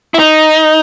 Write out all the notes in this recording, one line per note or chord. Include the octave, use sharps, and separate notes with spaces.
E4
D#4